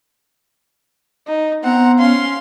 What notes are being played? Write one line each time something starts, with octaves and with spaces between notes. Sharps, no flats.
D#4
B3 C4 F#5 A#5
C#4 F5 C6